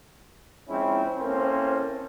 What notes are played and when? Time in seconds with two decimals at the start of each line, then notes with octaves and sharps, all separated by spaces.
0.69 F3 G#3 C4 C#4 E4
1.17 A#3 C4 C#4 E4 A4 C5